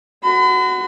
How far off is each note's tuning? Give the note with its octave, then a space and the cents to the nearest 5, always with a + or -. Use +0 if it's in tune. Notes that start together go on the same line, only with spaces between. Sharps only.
F#4 +0 B5 +45